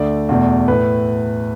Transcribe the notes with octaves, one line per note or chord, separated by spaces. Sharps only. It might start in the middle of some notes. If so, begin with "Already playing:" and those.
Already playing: D2 D3 A3 D5
E2 B2 A3
A2 A3 B4